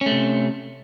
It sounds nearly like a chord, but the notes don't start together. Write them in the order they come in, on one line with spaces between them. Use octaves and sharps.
C#4 A3 C3